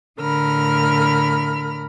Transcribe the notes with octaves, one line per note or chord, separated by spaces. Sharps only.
A2 D3 A#4 B5 F6